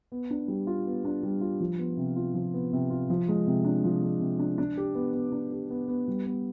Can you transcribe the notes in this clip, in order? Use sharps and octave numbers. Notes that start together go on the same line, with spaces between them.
B3
D4
G3
F4
B3
D4
G3
F4
F3
B3
C3
F4
F3
B3
C3
F4
F3
G#3
C3
D4
F3
G#3
C3
D4
D4
G4
B3
B3
D4
G4
B3
B3
G3
B3